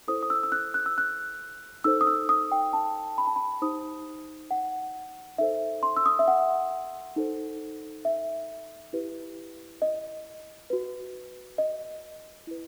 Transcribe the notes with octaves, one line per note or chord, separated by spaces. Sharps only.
E4 A4 C5 D#6
D#6
E6
E6
F#6
F#6
E6
F#6
D#4 A4 C5 E6
D#6
E6
D#6
G5
A5
B5
A5
B5
D#4 G4 C5 D#6
F#5
D#4 A4 C5 E5
C6
E6
D#6
E5
F#5
D#4 A4 C5
E5
E4 G4 B4
D#5
F#4 B4
D#5
E4 B4